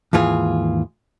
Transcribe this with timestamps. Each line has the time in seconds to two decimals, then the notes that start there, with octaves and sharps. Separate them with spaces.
0.13 D#2 G#2 E3 F4 G#4